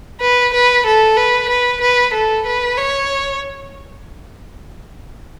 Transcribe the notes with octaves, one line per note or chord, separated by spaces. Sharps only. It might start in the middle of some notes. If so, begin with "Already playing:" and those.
B4
B4
A4
B4
B4
B4
A4
B4
C#5